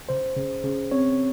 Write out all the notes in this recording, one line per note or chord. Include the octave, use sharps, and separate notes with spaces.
C#3 C5
C#3
C#3
C4 C#5